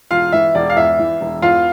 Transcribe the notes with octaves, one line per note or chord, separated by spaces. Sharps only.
E1 F4 F5
E3 E5
E1 D5
F5
E2 E5
E3
E1
E2 F4 F5